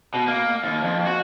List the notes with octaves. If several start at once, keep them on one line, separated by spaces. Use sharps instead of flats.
B2
A#3
D#2
F2
F#4